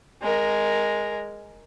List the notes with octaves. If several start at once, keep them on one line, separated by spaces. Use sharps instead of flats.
G#3 A#4